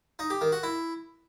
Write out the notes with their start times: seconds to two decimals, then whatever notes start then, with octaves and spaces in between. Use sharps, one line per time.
0.19 D#4
0.30 G4
0.41 D#3
0.52 F#4
0.63 E4